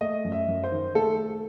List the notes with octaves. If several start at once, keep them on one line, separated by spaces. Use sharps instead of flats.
A3 D#5
F#2
E5
F#2
C5
D#3
A3 A4